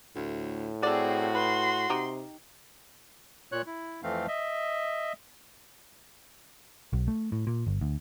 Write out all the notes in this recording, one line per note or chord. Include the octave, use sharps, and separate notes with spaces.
D2 A2
C4 F#4 G#4 A4 D5
B4 C6
C3 D#4 G4
A#2 C#5 F#6
E4
F2 E3 A3 C4 F5
D#5 E5
B1
A3
A2
A#2
G1
D2